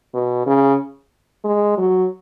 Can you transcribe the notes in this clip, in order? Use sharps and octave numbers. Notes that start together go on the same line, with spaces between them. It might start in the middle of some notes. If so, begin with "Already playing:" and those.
B2
C#3
G#3
F#3